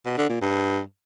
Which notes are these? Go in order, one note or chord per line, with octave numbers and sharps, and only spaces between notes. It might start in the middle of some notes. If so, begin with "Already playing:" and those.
B2
D3
A#2
G2